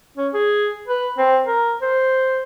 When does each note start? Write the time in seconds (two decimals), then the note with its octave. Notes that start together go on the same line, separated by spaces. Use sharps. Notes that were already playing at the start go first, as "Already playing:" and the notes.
0.17 C#4
0.34 G#4
0.88 B4
1.18 C4
1.46 A#4
1.82 C5